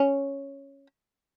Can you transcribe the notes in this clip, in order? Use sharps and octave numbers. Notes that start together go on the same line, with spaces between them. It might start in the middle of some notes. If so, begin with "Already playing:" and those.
Already playing: C#4